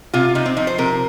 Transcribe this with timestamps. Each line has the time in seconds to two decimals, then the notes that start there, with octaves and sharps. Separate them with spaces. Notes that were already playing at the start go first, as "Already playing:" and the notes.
0.14 C3 F4
0.35 C3 D#4
0.46 C4
0.57 F3 D#4
0.67 C5
0.78 C3 A#4